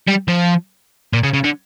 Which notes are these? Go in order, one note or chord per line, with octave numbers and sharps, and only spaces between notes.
G3
F3
A#2
C#3
C#3
D3